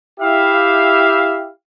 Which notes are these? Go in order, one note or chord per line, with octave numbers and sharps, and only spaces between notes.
E4 G4 E5 F5